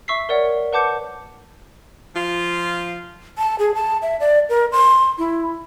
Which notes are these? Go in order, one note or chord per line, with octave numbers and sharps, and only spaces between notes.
E5 C#6 E6 B6 C7
A#4 C#5 D5 F#5
B4 F#5 A5 D6 G6 C#7
F3 F4
A5
G#4
A5
E5
D5
A#4
C6
E4